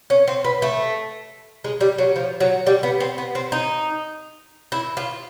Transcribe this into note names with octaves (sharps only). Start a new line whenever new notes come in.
C#4
C4
B3
A3
G#3
G3
F#3
F3
F#3
G3
B3
C4
B3
C4
D#4
E4
F4